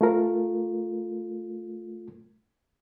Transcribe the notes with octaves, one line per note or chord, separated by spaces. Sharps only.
A3 F4 A#4